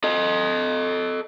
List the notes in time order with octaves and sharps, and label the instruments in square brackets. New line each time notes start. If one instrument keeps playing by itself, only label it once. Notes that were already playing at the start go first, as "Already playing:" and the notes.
[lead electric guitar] A4 D#5